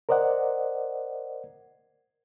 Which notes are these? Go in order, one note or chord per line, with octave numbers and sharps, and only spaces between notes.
A#4 C5 D5 D#5 F#5